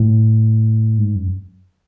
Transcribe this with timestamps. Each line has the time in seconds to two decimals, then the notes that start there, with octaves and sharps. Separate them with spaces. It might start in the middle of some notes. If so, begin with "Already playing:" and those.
Already playing: A2
0.98 G#2
1.16 F#2